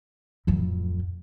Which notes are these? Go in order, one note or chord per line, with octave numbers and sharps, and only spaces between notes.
D1 F2